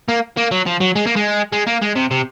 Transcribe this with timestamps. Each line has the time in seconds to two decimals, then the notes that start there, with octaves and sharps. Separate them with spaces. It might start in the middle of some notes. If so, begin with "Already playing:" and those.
0.08 A#3
0.37 A#3
0.52 F#3
0.66 F3
0.81 F#3
0.96 G#3
1.06 A#3
1.16 G#3
1.52 G#3
1.67 A#3
1.82 G#3
1.95 C3
2.11 C3